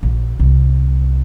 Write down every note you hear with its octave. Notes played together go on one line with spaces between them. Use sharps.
A#1
C2